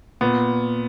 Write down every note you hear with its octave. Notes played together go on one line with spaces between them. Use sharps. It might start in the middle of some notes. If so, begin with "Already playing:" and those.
A#2 B3